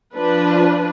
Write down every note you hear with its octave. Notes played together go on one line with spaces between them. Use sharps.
F3 D4 B4